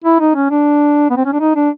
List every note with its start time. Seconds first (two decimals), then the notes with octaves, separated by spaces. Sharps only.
0.04 E4
0.20 D#4
0.35 C#4
0.51 D4
1.10 B3
1.17 C4
1.25 C#4
1.33 D4
1.40 D#4
1.56 D4